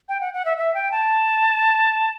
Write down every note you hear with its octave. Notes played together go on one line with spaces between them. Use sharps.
G5
F#5
F#5
E5
E5
G5
A5